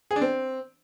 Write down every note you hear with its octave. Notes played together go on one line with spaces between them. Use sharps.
G#4
D4
C4